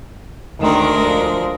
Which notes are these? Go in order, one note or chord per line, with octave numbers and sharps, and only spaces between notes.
D2 D#3 G#3 A#4
F3